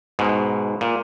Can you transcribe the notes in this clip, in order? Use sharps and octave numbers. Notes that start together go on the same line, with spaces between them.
G#2 B2
A#2